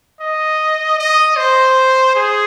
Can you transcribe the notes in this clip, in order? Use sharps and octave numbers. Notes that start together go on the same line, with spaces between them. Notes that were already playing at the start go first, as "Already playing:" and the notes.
D#5
D#5
C5
G#4